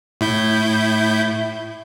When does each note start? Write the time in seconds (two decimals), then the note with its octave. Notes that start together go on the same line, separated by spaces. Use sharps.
0.21 A2 E4 G6